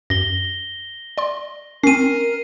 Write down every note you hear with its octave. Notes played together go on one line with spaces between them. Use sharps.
F#2 A#6 G7
D5 C6
C4 C#4 A#4 C7 D#7